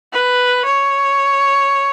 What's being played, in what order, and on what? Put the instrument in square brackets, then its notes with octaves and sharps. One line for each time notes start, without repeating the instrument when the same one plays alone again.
[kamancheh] B4
C#5